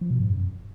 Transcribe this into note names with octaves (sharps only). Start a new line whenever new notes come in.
F3
B2
G#2
F#2